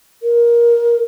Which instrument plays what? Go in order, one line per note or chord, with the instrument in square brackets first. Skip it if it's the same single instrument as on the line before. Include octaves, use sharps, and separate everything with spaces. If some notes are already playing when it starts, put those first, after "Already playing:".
[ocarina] A#4